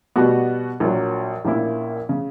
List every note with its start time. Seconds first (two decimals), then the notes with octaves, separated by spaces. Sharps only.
0.16 B2 G3 B3 F#4
0.80 A#1 A#2 F#3
1.45 A#1 A#2 A#3 C#4 E4
2.09 C#3